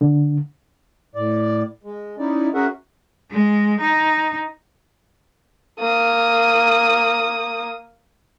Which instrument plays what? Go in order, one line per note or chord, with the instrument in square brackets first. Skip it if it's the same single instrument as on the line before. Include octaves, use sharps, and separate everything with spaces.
[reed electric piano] D3
[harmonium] A2 D5
G#3
C#4 D#4 E4 D5
C#4 F#4 G#4 A#4 E5 F#5
[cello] G#3
D#4
[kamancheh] A#3 D#6